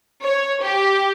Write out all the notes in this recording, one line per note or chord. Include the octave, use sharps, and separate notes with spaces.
C#5
G4